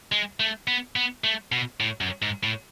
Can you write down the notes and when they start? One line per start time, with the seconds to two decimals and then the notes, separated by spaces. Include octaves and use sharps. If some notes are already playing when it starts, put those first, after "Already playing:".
0.12 G#3
0.40 A3
0.68 B3
0.96 B3
1.24 A3
1.52 B2
1.80 A2
2.01 F#2
2.22 G#2
2.43 A2